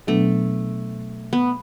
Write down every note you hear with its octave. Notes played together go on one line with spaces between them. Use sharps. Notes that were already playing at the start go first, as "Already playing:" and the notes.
B2 F#3 A3 B3 D4
B3